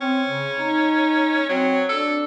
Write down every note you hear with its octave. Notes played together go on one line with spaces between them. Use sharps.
C4 C#4
C#3
D#4
F#3 C4
D4 A4